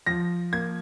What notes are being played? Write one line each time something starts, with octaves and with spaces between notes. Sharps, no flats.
F3 A#6
A#3 G#6